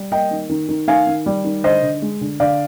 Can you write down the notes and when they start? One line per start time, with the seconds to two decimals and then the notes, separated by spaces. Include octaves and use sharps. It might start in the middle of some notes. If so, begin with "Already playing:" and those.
Already playing: G3
0.12 A#3 D#5 G5
0.31 D#3
0.50 D#3
0.69 D#3
0.88 D#3 F5 G#5
1.07 D#3
1.26 G3
1.44 D#3
1.64 D3 C5 D#5
1.83 D3
2.02 G#3
2.21 D3
2.40 D3 D5 F5